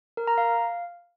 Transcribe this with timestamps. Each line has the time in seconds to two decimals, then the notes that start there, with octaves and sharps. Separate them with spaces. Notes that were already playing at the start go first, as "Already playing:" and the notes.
0.17 A#4
0.27 A#5
0.38 F5